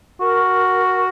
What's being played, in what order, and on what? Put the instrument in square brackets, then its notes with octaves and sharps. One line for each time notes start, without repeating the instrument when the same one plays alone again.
[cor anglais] F#4 [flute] A#4